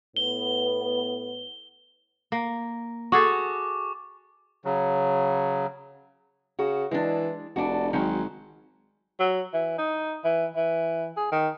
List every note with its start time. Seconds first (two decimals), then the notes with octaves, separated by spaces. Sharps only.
0.16 A2 B3 G7
2.32 A#3
3.12 F#4 G#4 A4 C#6 D6
4.65 C#3 F#3
6.59 C#3 F#4
6.91 E3 G#3 D4
7.56 F1 D4 F#4
7.93 G#1 D#3 F#3
9.20 F#3
9.53 E3
9.78 D#4
10.24 E3
10.56 E3
11.17 G#4
11.32 D#3